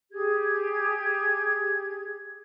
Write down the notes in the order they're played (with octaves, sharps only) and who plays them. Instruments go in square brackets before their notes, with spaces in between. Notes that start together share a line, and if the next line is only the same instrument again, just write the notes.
[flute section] G4 G#4 G#6